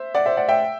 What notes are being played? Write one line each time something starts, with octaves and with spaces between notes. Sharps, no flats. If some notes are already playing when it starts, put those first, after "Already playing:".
Already playing: C5 E5
D5 F#5
C5 E5
D5 F#5
E5 G5